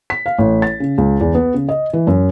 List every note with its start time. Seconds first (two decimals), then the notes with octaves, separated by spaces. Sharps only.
0.10 B6
0.26 F5
0.38 A1
0.62 A6
0.80 C#3
0.98 C#2
1.21 E2
1.35 B3
1.54 C#3
1.69 D#5
1.93 E3
2.07 F#2